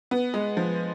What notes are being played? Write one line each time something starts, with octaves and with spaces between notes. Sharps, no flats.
B3
G#3
F3